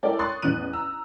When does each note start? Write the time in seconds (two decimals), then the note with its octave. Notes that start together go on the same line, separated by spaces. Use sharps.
0.03 E4 A4 A#4 C#5 D5 G5
0.19 C6 C#6 D#6 F#6 A6
0.42 A1 E2 E3 F#6 D#7
0.73 A#5 E6